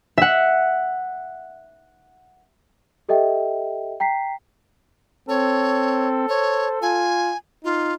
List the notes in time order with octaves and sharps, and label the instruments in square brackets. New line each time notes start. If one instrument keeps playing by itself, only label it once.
[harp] E5 F#5
[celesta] G4 A4 D#5 E5 G5
G5 A#5 B6 C7
[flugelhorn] C4 [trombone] A4 [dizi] C#5
[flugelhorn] C5 [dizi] C#5
[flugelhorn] F4 [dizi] G#5
[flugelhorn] D#4 [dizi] F4